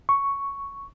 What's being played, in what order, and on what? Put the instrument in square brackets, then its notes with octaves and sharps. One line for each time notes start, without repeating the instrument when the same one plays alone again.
[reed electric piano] C#6